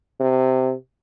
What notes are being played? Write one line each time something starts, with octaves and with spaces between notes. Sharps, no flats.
C3